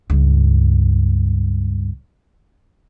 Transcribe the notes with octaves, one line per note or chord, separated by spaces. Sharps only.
C#2 G2